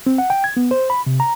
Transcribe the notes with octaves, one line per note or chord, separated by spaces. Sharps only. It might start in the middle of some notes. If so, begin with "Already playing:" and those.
C4
F#5
G5
G#6
B3
C5
B5
C3
A#5